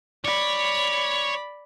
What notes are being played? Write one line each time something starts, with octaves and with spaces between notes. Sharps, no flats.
C#5 D5 B5